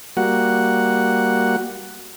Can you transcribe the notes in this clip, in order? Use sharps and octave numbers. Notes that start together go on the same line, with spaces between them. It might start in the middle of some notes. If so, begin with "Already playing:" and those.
G3 A#3 F#4 F#5